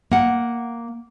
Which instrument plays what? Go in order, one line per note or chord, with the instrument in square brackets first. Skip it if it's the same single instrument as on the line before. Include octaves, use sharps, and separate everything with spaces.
[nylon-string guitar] A#3 F#5